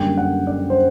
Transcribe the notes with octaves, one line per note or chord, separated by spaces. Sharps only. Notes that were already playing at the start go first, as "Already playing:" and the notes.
Already playing: F#2 D3 G3 A#3 G5
F#5
D5
C5